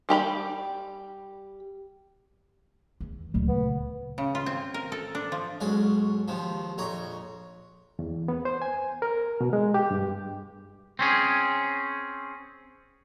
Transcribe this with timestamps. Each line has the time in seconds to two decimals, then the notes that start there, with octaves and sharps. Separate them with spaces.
0.09 G3 G4 A#5 B5
3.00 E2
3.34 D2 A#2 F#3 A3 A#3
3.48 C#3 B3
4.18 C#3
4.35 F4
4.46 C4
4.74 A#4
4.92 A4
5.15 D4
5.32 F3
5.61 B1 G#2 C#4 D5
6.28 D#2 C3 F3
6.78 A#1 F2 C#5 A#5
7.99 E2
8.28 B3
8.45 C5
8.62 G#5
9.02 A#4
9.41 B2
9.53 G#3
9.74 G4
9.91 G2
10.99 C4 C#4 G#4